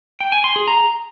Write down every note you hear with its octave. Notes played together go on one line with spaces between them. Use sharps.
G5
G#5
C6
G#4
A#5